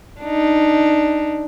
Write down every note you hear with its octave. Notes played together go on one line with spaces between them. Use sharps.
D4 D#4